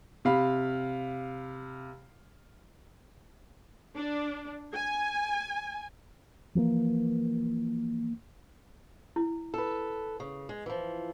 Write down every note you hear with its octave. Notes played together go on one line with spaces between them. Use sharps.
C3 F5 B5
D4
G#5
E3 F3 G#3 A#3
E4
A4 B4
C#3
G#3
E3 F3